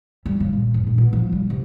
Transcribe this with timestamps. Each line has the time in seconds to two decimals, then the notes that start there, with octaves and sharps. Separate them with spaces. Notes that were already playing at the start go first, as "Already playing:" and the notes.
0.26 G3
0.40 C#3
0.53 A#2
0.74 F#1
0.87 A#1
0.98 B2
1.13 F3
1.32 G3
1.50 C3